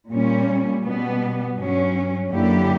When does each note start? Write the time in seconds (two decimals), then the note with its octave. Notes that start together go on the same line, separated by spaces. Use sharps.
0.11 A#2 G3 C#4
0.83 B2 G3 B3
1.57 G2 F#3 C#4
2.29 F#2 D3 A#3 E4 G4